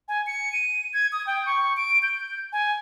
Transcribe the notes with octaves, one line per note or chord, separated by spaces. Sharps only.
G#5
C#7
D#7
G#6
D#6
G5
C#6
D7
G6
G#5